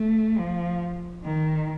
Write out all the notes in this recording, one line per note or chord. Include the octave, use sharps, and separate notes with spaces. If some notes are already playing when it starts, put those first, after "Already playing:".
Already playing: A3
F3
D#3